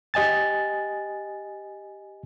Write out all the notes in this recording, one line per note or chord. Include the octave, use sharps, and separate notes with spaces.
G4 D#5 G#5 A6